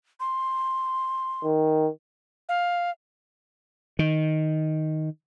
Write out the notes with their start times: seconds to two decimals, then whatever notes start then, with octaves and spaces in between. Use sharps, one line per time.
0.20 C6
1.44 D#3
2.49 F5
3.99 D#3